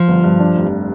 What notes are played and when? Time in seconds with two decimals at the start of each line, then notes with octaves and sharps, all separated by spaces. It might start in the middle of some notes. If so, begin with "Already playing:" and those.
Already playing: F3
0.08 G1
0.24 G2
0.40 D4
0.56 F1